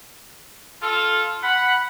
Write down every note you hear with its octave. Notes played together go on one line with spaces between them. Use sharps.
F4 A4
F#5 B5